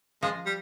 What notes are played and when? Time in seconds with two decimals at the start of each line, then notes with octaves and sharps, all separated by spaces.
0.23 F3 G#3
0.46 G3